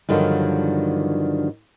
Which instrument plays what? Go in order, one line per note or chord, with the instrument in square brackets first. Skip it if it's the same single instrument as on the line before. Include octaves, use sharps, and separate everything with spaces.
[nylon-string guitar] G2 D3 D#3 F3 F#3